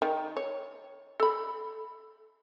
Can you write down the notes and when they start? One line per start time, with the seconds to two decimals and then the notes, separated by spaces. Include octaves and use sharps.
0.02 D#3
0.37 C#5
1.20 A4 B5